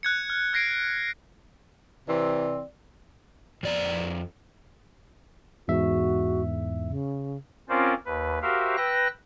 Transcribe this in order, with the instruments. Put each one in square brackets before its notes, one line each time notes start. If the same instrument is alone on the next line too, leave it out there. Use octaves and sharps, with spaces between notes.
[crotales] F#6 G#6 C#7
F6
F6 G#6 A#6 C7 D7
[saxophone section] C3 E3 C4 [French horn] D5
[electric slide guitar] F2 D5 A#5
[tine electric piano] E2 G#2 E5 [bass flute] F#4
[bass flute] C#3
[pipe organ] C4 C#4 F4 A#4 C5 D5
D#2 B4
F#4 G4 A#4 C5 E5 F5
B4 G5 E6 F#6 A#6